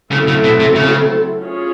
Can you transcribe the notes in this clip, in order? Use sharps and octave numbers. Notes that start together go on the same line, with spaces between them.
C#3 F#3 A3 C4 E4 A4
C#3
B2
C3
C#3
C#4 F4 G#4 C#5